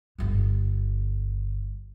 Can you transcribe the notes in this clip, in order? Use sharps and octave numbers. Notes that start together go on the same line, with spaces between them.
G1 D3